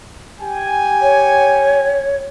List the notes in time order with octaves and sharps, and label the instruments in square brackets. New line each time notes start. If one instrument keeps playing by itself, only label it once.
[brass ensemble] G4 G5 G#5
[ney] C#5